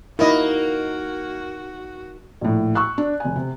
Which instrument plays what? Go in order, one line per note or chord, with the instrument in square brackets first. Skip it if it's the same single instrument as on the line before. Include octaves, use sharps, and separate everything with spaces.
[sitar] A#3 [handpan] D#4 A#4 [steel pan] E4 D#5 [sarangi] F#4
[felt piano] A#1 A2
C#6 E6 F#6
D4
F1 G#5
C3